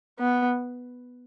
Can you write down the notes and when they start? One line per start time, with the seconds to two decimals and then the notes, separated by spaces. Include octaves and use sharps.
0.19 B3